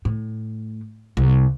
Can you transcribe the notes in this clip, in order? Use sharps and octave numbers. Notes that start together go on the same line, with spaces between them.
A2
C2